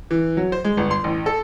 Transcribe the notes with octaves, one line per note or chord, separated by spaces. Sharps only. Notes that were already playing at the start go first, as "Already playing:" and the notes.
E3
F#3
C5
G#3
G1
C6
A1
A4